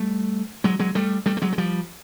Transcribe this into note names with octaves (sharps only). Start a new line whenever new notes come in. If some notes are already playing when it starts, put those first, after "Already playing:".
Already playing: G3 A3
F#3 G#3
F#3 G#3
G3 A3
G3 A3
A3
F#3 G#3
G#3
F3 G3